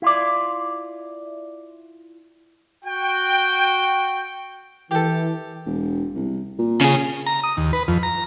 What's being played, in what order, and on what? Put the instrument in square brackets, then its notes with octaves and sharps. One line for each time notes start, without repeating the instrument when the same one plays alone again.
[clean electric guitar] E4 F4 D5
[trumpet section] F#4 G5
[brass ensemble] E3 [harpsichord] G4 A4
[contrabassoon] E1
C2
A#2
[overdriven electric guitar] C#3 G#4
[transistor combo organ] A#5
D#6
D#2
B4
F2
A#5